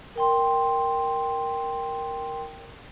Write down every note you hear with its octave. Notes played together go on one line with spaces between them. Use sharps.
A#4 G5 C6